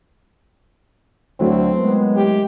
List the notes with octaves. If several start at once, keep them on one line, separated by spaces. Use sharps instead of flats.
D2 E3 F#3 A3 C4
C3 D#3 G#3 B3
G4